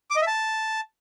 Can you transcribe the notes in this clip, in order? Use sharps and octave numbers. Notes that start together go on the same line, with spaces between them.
D6
D#5
E5
A5